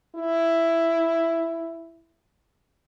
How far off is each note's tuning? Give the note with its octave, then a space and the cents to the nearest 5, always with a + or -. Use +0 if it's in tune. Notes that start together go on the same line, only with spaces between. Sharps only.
E4 +5